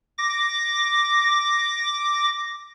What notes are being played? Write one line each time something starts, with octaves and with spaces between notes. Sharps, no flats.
D6 A#6